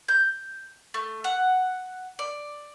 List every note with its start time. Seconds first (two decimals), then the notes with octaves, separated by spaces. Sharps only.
0.08 G6
0.94 A3
1.24 F#5
2.19 D5